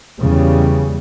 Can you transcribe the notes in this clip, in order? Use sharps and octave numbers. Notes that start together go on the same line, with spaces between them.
E2 C#3 G3